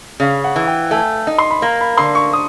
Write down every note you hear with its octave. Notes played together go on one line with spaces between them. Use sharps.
C#3 F5
F#5
E3
G5
A3 G#5
D#4
C6
B5
A#3 A#5
B5
D3 C6
C#6
D#6